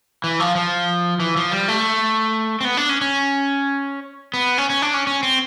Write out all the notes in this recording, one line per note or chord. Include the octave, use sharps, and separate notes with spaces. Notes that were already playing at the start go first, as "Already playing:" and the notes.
E3
F3
F3
E3
F3
G3
A3
C4
B3
D4
C#4
C#4
B3
C#4
C#4
D4
C#4
C#4
C4